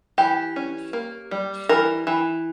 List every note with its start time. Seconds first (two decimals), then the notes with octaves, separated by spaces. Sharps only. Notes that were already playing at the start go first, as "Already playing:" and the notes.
0.18 E3 G4
0.56 C#4
0.93 A#3
1.31 G3
1.69 E3 A#4
2.07 E3